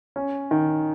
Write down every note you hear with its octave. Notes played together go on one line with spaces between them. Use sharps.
C#4
D#3